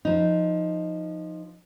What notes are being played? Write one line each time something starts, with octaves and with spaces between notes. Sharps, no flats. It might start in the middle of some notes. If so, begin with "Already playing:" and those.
F3 D#4